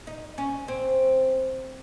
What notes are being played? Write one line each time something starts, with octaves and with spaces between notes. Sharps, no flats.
D#4
C#4
C4